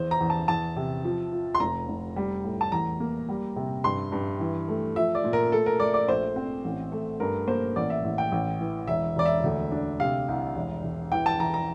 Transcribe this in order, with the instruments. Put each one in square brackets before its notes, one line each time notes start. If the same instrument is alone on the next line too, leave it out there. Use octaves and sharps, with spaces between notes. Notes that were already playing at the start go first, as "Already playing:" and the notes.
Already playing: [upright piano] E2 C5
A#5
E2
A5
E2 A5
C3
F3
F4
C6
F1 A#5
F1
G3
A2
A5
E2 A#5
A#3
G3
C3
G2 C6
G2
E3
A3
F3 E5
D5
A#2
A#4
A3 A4
A#4
A3 D5
D5
A#1 C5
C4
A1
A3
G2 A#4
A#3 C5
A1 D5
E5
A1
G5
A1
E3
E1 E5
E1 D5
E5
D2
D4
C3 F5
C2
E1
E1
E3 G5
A5
E3 A#5
A#5